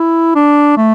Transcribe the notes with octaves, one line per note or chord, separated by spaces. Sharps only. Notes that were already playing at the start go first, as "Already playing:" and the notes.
Already playing: E4
D4
A3